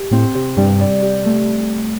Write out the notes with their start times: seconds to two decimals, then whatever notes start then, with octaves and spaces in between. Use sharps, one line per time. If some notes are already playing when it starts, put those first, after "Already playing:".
Already playing: G4
0.11 A2 C4
0.34 C3
0.57 G2 G3
0.80 D5
1.02 G4
1.25 A3